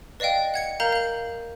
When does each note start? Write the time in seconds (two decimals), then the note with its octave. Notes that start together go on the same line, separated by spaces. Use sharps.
0.20 B4 D5 D#5 F5 G5
0.54 F#5 G#6 C#7
0.80 A#4 F5 A#5 G6 F#7
0.92 F5 F#7